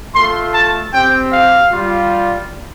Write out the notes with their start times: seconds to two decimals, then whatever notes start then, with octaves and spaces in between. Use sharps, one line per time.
0.15 A3 F4 C6
0.54 A5
0.93 C4 G4 G5
1.32 F5
1.71 G3 F4